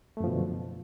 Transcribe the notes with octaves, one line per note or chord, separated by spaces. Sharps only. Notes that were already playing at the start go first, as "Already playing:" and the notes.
F#2 B2 D3 F3 A3